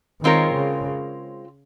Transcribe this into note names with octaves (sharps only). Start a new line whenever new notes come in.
D#3 G#3 C4 F4 A#4 C#5
C#3